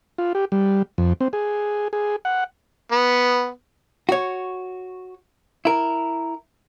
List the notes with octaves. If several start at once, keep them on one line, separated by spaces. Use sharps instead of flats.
F4
G4
G3
F2
C4
G#4
G#4
F#5
B3
F#4 C#5
E4 A#4